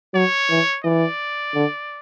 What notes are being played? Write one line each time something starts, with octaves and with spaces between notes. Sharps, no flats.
F#3 C#5
E3
E3 D5
D3